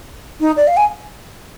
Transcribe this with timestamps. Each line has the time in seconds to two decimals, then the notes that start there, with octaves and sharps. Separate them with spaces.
0.40 D#4
0.56 D5
0.67 F5
0.77 G#5